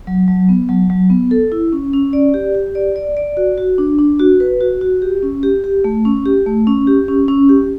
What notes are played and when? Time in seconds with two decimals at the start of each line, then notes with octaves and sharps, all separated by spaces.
0.07 F#3
0.28 F#3
0.49 B3
0.69 F#3
0.90 F#3
1.10 B3
1.31 A4
1.52 E4
1.73 C#4
1.93 C#4
2.13 D5
2.34 G4
2.55 G4
2.75 D5
2.96 D5
3.17 D5
3.37 F#4
3.58 F#4
3.78 D4
3.99 D4
4.19 F#4
4.40 B4
4.61 F#4
4.81 F#4
5.02 G4
5.23 C#4
5.43 G4
5.64 G4
5.84 A3
6.05 C#4
6.26 G4
6.46 A3
6.67 C#4
6.87 G4
7.08 C#4
7.28 C#4
7.49 G4